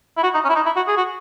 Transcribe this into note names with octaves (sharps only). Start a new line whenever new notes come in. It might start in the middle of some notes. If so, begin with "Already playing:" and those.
E4
F#4
D#4
C#4
E4
D#4
E4
F#4
G#4
F#4